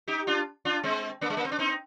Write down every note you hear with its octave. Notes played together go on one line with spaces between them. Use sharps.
D#4 G4
D4 F4
D4 F4
G#3 C4
A#3 D4
G#3
A#3
C4
D4
C4 D#4